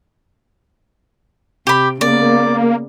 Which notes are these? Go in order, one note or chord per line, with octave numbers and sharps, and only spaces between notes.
C3 G4 B5
C#3 A#3 B3 D5